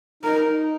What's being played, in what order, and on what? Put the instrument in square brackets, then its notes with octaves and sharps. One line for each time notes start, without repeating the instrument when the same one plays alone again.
[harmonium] D#4 [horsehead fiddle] A#4
[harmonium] D#4